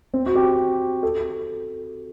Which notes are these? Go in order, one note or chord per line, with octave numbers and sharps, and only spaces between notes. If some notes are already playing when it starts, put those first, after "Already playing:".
C4
F#4
G4
A4